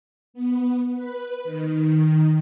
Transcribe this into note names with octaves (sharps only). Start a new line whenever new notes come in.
B3
B4
D#3